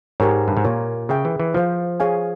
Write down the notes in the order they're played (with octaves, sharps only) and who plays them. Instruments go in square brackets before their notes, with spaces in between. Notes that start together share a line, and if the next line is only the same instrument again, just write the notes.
[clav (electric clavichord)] G#2 [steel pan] G4 A#4 C#5
[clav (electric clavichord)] G2
G#2
[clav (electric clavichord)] A#2 [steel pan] F4 A#4 C#5
[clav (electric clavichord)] C#3 [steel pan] G#4 E5 G5
[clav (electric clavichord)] E3
E3
[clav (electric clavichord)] F3 [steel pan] F4 C5 F5
[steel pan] G#4 C#5 F5 G#5